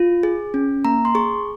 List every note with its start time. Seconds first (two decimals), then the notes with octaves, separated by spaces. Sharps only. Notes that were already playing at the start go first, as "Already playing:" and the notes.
Already playing: F4
0.23 G#4
0.54 C#4
0.85 A#3 A#5
1.05 C6
1.15 G#4 C#6